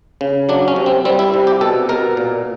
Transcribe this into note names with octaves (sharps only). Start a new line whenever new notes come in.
C#3
F#3 D4
C#4
C3
C4
G3 C4
E4
C3
G4
B2 A4
B2 A#4
A#2